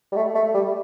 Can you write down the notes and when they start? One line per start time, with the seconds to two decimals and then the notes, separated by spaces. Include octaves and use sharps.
0.12 G3
0.16 A3
0.35 A3
0.54 G3